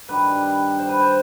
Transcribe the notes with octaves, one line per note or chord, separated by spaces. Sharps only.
G2 D#3 G3 B4
C5
B4
C5